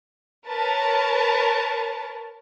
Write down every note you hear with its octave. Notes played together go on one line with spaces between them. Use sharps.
A#4 B4 C#5 A5